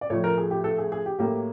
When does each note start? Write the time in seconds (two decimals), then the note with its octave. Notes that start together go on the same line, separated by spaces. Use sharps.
0.01 D5
0.10 A2 F3 A3 C#5
0.24 A#4
0.38 G#4
0.51 G4
0.64 A4
0.78 G#4
0.92 G#4
1.06 G4
1.19 A2 F#3 A#3 G4